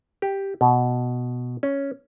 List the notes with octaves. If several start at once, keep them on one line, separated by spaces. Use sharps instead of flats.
G4
B2
C#4